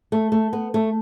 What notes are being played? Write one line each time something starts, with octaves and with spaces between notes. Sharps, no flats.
A3
A3
B3
A3